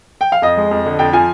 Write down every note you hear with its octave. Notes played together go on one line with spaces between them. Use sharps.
G5
F5
F2 D#5
G#3
F2
D3
F2 G5
F3 G#5